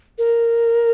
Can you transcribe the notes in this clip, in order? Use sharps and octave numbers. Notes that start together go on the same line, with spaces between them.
A#4